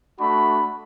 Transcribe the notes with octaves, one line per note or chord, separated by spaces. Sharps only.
A3 D4 F#4 B5